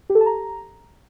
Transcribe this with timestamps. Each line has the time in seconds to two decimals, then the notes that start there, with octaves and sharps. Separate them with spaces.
0.10 G4
0.15 A4
0.21 A5
0.26 A#5